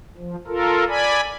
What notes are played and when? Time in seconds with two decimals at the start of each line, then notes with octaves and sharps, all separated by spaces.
0.17 F3
0.47 F4 A4 A#4
0.88 D5 G#5 B5